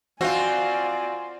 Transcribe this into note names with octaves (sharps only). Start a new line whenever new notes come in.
C4 F4 F#4 C5 D5 F5 G#5